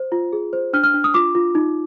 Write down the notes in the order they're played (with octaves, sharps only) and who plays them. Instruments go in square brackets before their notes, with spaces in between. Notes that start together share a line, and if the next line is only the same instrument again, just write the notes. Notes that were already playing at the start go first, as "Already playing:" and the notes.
Already playing: [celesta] C5
F4
G#4
C5
D4 F6
F6
D4
D#6
F4 D6
F4
D#4